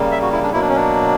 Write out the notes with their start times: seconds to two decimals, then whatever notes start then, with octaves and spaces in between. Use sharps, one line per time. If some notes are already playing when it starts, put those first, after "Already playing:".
Already playing: C#3 G3 A#3
0.11 E5
0.22 F#4
0.32 E4
0.43 D4
0.53 B2 F#3 A#3 E4
0.61 D4
0.69 C#4
0.76 D4